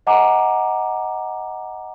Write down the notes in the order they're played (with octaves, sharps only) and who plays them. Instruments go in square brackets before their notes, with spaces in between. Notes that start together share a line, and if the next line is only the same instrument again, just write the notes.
[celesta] D#5 F#5 G#5 A#5 D6